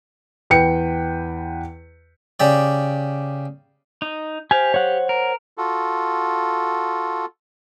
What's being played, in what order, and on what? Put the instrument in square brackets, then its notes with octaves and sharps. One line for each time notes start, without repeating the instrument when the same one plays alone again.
[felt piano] E2 B4 G5 C#7
[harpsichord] C#3 G4 D5
[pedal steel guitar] D#4
[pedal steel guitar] G4 F5 [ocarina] C5 [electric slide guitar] G#5
[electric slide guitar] C#5 F#5
[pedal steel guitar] A#4
[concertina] F4 F#4 A4